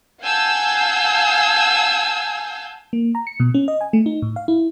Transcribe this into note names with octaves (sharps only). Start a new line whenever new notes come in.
F5 F#5 G#5 A5 E6 G6
A#3
A#5
C#7
B2
C#4
D#5
G#5
A3
D#4
A2
F5
E4